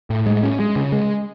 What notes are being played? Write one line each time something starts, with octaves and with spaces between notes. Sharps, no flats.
A2
G#3
C#4
G#3
C#3
G#3